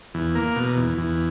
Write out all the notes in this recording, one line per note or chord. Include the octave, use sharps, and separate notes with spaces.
E2
A#3
B2
E2
E2